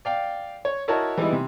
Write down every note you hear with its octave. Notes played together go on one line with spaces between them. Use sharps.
D5 F5 G5
C#5
E4 F#4 A#4 C#5 D#5 A5
E3 G3 G#3 B3 D#4 E4
C3